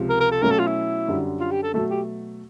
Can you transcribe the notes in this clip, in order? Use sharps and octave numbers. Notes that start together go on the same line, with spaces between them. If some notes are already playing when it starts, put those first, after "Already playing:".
Already playing: C#2 C3 F3
A#4
A#4
A4
B2 F#3 A3 C#4 A#4
A4
F4
E4
F#2 D3 G3
F4
G4
A4
B2 F#3 A3 A4
G4